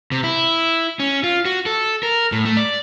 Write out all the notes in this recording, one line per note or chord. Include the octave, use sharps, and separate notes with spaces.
C3
E4
C#4
F4
F#4
A4
A#4
A2
A3
D5